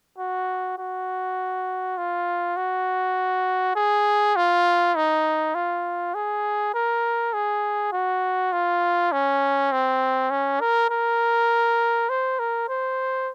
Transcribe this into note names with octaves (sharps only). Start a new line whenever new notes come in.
F#4
F#4
F4
F#4
G#4
F4
D#4
F4
G#4
A#4
G#4
F#4
F4
C#4
C4
C#4
A#4
A#4
C5
A#4
C5